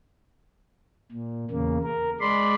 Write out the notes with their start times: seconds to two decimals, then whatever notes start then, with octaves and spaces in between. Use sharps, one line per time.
1.12 A#2
1.51 E2 C#3 A#3
1.83 A#4
2.20 G#3 D5 B5 C6